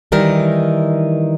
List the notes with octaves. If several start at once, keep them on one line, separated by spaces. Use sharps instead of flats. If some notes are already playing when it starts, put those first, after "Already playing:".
D#3 E3 G3 A#4